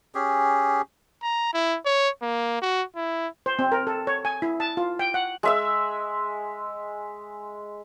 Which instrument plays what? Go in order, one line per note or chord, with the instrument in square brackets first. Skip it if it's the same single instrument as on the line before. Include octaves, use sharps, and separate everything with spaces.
[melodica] C#4 G4 G#4
[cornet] A#5
E4
C#5
A#3
F#4
E4
[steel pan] C5
C4
A#4
A4
C#5
G#5
E4
A5
F4
G5
F#5
[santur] G#3 E5 E6